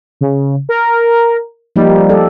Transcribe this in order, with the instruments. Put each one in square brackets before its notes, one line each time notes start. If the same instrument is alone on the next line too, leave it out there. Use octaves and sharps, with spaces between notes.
[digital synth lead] C#3
A#4
[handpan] F3 A#3 D#4 [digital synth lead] G3
[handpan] G4 A4 D5